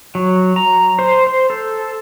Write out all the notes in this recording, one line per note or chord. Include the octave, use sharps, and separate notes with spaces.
F#3
A#5
C5
C5
A4